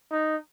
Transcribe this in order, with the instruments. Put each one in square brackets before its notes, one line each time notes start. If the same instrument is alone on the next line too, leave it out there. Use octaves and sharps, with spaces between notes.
[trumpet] D#4